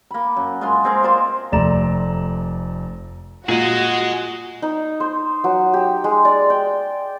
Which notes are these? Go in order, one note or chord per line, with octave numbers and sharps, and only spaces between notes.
A#3 B5
F#2
G#3 F4 C6
G#3 C4 G#4 A#4
F4 A#4 C5 D5
F1 A3 D5 A#5 E7
A#2 F#4 G#4 D#5
D#4
C5
F#3
G4
G#3
D5
G5